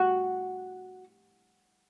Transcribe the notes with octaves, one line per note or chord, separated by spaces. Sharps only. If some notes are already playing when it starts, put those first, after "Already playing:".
Already playing: F#4